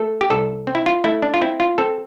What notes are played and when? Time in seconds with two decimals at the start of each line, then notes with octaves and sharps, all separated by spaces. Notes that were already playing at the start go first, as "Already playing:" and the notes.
Already playing: A3 A4
0.21 G4
0.30 C2 A4
0.67 C4
0.75 E4
0.86 F4
1.04 A3 E4
1.22 D4
1.34 F4
1.41 C4 E4
1.60 F4
1.78 C4 A4